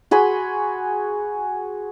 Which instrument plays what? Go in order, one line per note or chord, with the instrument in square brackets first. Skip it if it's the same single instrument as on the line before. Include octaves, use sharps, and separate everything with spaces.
[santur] F#4 G#4 B5 C6